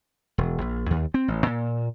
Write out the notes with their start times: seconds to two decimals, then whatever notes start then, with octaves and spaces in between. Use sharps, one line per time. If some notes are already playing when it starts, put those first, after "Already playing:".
0.38 E1
0.61 A#1
0.91 D#2
1.14 C4
1.28 A1
1.46 A#2